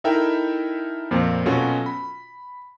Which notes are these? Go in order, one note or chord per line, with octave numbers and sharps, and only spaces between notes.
D#4 E4 A4 A#4 E5 G5
F2 A#2 A#3 C4
B2 F#3 C#4 F4 F#4 A4
B5